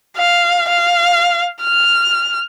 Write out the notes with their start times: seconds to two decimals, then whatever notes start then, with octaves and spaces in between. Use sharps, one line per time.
0.17 F5
0.70 F5
1.62 F6